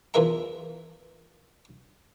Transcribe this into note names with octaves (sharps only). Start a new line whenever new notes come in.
E2 E3 F4 A#4 E5 A#5